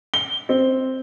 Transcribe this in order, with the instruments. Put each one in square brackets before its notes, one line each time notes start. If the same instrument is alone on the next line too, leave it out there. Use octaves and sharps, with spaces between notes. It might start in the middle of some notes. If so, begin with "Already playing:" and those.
[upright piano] G7
C4